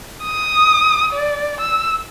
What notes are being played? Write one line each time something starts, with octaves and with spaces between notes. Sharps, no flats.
D#6
D5
E6